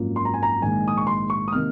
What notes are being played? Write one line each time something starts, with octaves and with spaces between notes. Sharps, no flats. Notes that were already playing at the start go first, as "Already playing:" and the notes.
Already playing: G#1 F#2 F3 A#3 F4
C6
A#5
G#5
A#5
A#1 G#2 D#3 G#5
D#6
C#6
C6
C#6
D#6
C3 D#3 A#3 F6